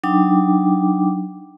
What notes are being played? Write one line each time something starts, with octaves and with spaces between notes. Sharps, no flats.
F#3 D4 D#4 G5 D6